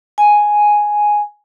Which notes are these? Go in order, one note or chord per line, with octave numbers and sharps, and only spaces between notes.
G#5